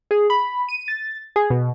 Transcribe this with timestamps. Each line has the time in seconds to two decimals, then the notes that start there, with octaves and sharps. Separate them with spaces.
0.11 G#4
0.30 B5
0.69 D#7
0.88 A6
1.36 G#4
1.50 B2